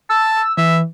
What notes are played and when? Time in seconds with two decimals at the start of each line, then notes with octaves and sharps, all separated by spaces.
0.10 A5 E6
0.57 E3 E5